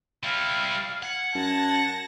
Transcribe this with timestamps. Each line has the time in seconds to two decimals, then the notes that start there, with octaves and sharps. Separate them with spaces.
0.23 G3 E4 F5
1.03 F#5 G#6
1.35 F#2 A5 A#6